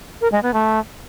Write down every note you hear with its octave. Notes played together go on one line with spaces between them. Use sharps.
A#4
G#3
B3
A3